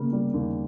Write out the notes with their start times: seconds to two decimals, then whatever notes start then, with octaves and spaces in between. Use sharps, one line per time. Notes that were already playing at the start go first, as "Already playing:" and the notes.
Already playing: C#3 A#3 B3
0.12 G3
0.34 D#2